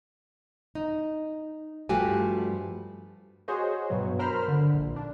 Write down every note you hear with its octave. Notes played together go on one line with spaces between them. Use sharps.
D#4
G2 F3 A3 F#4 G4 G#5
F#4 G#4 C5 C#5 D#5
G2 B2 F#3
A#4 C5 B5 F6
D3
A#1
D4